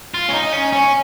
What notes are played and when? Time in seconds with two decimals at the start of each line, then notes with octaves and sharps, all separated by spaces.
0.14 F4
0.29 C#4
0.34 D#4
0.53 C#4
0.73 C#4